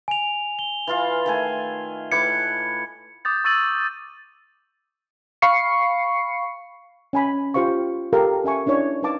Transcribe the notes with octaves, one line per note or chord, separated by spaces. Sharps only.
G#5 F7
G7
E3 F4 F5
D#3 A3 G#5
A2 B4 D6 G#6 C#7
D6 D#6 G6 A6
C#6 E6 A6 D#7 F#7
F5 B5 C#6 C7 C#7
C#4 G#5 B5
F4 G4 C5 F5 C#6
G4 A4 A#4 F5 A5
C#4 E5 G#5 C#6
C#4 D4 E4 C#5
D#4 B4 F5 A5 D6